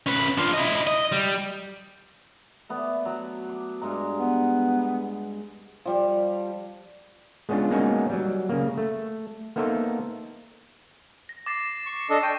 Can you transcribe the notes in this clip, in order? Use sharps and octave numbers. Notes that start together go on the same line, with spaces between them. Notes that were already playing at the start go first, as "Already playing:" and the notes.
C#4 B4
D4 F4
E4 D#5
D#5
G3
A3 B3 D5
F#3
D6
G2 G#3 A#5
B3
F3 G3
G#3 B3 C#4 D4 F4
G#3 A#3 B3 C#4 D#4 F#4
F#3 G3
C#3 A#3
A3
A#3 B3 D#4 A4 C5 E5
A#6
D6 A6 C7
C#6
D4 A4 D#5
G5 C#6 D#7